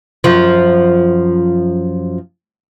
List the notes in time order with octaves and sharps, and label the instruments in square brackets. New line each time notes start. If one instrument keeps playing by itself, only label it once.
[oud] F#2 F3